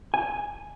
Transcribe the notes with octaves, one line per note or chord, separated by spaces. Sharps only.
G#5